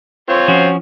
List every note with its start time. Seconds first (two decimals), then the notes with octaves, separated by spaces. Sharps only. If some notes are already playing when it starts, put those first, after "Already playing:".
0.29 C4 F4 C#5
0.48 F3 C#4 F#4